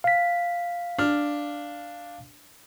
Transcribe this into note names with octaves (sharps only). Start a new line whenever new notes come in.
F5 B6
D4 F6